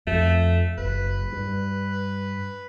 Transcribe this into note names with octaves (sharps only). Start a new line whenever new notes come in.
F2 A3
F#1 B4
G2